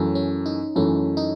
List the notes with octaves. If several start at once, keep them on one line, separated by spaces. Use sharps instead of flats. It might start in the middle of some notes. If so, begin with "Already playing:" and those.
Already playing: F#2 E3 A3 C#4
C#4
D#4
F#2 E3 A3 C#4
D#4